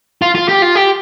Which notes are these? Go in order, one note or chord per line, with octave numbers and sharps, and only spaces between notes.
F4
F4
G4
F4
G4